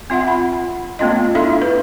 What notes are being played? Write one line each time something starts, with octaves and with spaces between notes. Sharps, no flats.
C4 F4 E5 F#5
B5
A3 B3 C#4 F4 D#5
D4 E4 A4 E5 F5 C6
B4